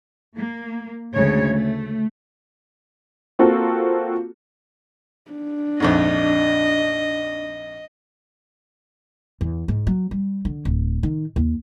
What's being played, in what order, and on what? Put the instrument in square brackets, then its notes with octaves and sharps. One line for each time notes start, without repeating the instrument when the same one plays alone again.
[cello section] A#3
D2 C#3 G#3 C#5
A3
[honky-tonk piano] A#3 C4 F4 F#4 A4
[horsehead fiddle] D4
[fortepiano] A#1 F2 G#2 [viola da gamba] D#5
[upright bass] E2
G#2
F#3
G3
D3
D1
D#3
D#2